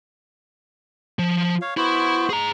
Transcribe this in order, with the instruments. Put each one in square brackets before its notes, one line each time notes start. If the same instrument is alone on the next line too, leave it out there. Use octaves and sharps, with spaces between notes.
[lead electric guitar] F3
[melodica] C#5 F5
[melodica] B3 F#4 C5 [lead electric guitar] E4
[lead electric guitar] G#4 A#5